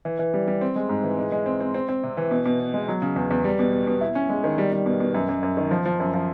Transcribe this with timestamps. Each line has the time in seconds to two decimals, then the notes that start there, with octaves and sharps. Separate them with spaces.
0.05 E3
0.19 E3
0.34 G3
0.48 G3
0.61 C4
0.76 G#3
0.89 G#2
1.04 E3
1.19 G#3
1.32 G#3
1.46 C4
1.60 C4
1.74 C4
1.89 C4
2.03 C3
2.17 E3
2.31 B2
2.46 B2
2.60 B3
2.74 G#3
2.88 F#3
3.02 C#3
3.16 E2
3.31 E2
3.44 G3
3.59 B2
3.73 B3
3.87 B2
4.01 E4
4.15 C#4
4.29 G#3
4.44 D#3
4.58 G3
4.72 G3
4.86 B2
5.00 B2
5.14 F#2
5.29 F#2
5.43 F#2
5.57 D#3
5.71 F3
5.85 F3
6.00 F#2
6.14 F3